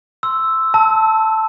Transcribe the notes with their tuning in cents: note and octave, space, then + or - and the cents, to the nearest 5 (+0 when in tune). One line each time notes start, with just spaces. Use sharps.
C6 +0 E6 +0
A5 +0 E6 -25